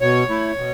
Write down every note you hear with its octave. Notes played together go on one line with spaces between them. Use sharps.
B2 C#5
A3 E4
B2